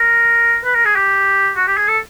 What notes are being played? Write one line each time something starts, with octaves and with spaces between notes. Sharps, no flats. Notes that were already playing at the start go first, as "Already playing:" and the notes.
Already playing: A#4
B4
A#4
G#4
G4
F#4
G4
G#4
A4